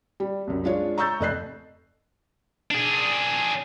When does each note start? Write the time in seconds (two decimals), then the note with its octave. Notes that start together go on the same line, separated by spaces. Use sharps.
0.20 G3
0.47 C2 F#2
0.64 G#3 D4 F4 C#5
0.98 A#5 C#6 E6 G6 A6
1.20 F1 A4 D#5 F#6 C7
2.71 D4 G#4